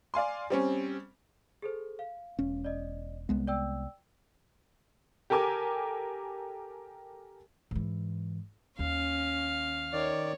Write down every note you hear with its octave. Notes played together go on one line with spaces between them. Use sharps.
D5 F5 G#5 C6
G3 C4 C#4
G#4 A4 C5
F5
E1 C#4
D5 D#5
C2 G#3 B3
D5 G5 E6
G4 A4 A#4 G#5 D6
G#2 E3
D#2 C#4 F5
D#3 C#5 D5